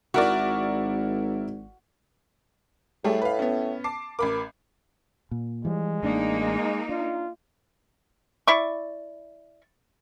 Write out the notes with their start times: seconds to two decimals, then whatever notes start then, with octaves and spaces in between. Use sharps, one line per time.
0.14 G#1 E4 F#4 A#4 D5
3.04 A2 G3 A3 G#4
3.22 B4 F5
3.39 B3 C#4
3.84 A5 D6 C7
4.19 A1 A#4 B5 D6
5.31 A#2
5.65 E3 F3 G3 G#3
6.03 A1 A#3 D4 D#4
6.40 G#3
6.89 D4 F4
8.47 E4 D5 C#6